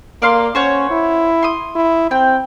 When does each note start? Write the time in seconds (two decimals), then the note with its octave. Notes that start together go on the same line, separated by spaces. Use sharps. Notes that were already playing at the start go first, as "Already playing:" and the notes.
0.22 A#3 D5 F5 C6
0.55 C#4 C5 C#5 F#5
0.90 E4
1.43 C6 D#6
1.76 E4
2.11 C4 G5